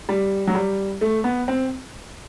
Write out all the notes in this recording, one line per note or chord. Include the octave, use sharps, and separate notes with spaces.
G3
F#3
G3
A3
B3
C4